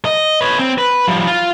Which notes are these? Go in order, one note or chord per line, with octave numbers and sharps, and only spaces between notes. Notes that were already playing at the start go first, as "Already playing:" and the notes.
D#5
B4 C#5
C4
B4
F3 G3
F4